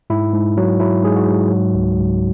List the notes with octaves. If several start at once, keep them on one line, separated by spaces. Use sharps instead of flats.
G#2 E4
G#2
F#3
F#3 E4
G#2 G#4
F#4
G#2
F#3
C#2
C#2